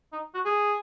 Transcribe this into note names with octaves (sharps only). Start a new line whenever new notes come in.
D#4
F#4
G#4